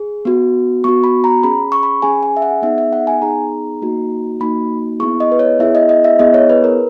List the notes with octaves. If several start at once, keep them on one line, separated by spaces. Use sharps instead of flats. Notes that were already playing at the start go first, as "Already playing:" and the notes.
Already playing: G#4
B3 F#4
B3 F#4 C#6
B5
A#5
C#4 G#4 B5
C#6
B5
C#4 G#4 G#5
G#5
E5
F#5
B3 D#4 G#4 E5
E5
F#5
G#5
B3 D#4 G#4 A#5
A#3 D#4 F#4
A#3 D#4 F#4 B5
B3 E4 G#4 C#6
D#5
B4
C#5
B3 E4 G#4 E5
D#5
D#5
E5
B3 E4 G#4 D#5
C#5
B4
A#4